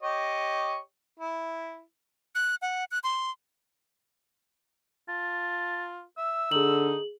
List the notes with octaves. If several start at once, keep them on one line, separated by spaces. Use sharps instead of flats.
G4 C#5 D#5
E4
F#6
F#5
F#6
C6
F4 A5
E5 E6
D3 D#4 G#4 F#7